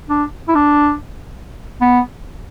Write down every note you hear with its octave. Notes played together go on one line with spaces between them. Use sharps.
D4
E4
D4
B3